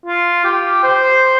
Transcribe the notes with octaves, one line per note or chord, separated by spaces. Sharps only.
F4
G4
C5